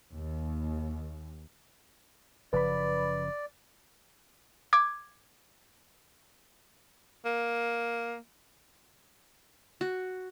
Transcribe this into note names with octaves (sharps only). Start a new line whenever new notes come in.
D#2
F#1 C#3 F3 B4 D5 B5
D6 G#6
A#3
F#4